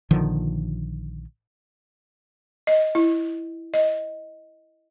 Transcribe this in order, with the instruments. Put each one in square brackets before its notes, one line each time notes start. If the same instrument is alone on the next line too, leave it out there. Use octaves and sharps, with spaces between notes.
[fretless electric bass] A#1 D3 D#3 F3
[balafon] D#5
E4
D#5